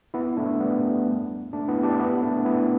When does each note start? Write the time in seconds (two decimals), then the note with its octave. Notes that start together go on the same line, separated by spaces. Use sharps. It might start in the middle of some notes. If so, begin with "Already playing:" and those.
0.14 B3 E4
0.37 A3 D4
0.60 G3 B3
1.53 A3 D4
1.68 B3 E4
1.83 D4 G4
2.00 B3 E4
2.22 A3 D4
2.45 B3 E4